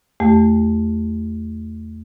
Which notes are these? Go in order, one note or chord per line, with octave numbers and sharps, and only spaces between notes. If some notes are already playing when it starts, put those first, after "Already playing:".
E2 A3 G4